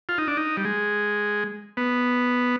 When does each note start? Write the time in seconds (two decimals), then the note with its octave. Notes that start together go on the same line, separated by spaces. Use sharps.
0.09 F4
0.18 D#4
0.28 D4
0.37 D#4
0.57 G3
0.65 G#3
1.77 B3